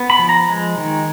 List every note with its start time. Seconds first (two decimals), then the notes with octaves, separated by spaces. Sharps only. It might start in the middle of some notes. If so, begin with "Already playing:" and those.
Already playing: B3
0.10 B5
0.19 F3
0.29 A#5
0.49 G#3
0.78 D#3